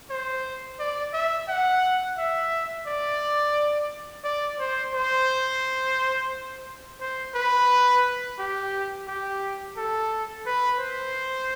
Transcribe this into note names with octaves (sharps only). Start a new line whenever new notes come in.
C5
D5
E5
F#5
E5
D5
D5
C5
C5
C5
B4
G4
G4
A4
B4
C5